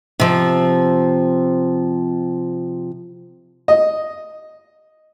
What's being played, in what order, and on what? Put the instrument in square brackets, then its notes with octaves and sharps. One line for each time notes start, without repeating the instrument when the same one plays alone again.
[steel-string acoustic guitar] C3 F3
[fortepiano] D#5